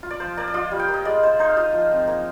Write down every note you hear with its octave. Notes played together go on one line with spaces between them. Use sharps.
F4
D5
F3 C5
A#3 D5
D5
F4 D#5
G3
G5
A#3
D#5
G#3 D5
G#3 C5
D#4 C5
F5
F4 D#5
F3
C4
A#3